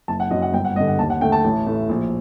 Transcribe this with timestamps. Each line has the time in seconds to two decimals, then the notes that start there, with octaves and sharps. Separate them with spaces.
0.08 F#1 A5
0.20 F#5
0.31 F#2 F#3 D#5
0.42 F#5
0.53 G1 G5
0.64 F#5
0.76 G2 D3 D#5
0.88 F#5
0.99 D#2 A5
1.10 F#5
1.21 D3 A3 G5
1.32 A5
1.44 A1
1.66 A2 A3
1.89 A#1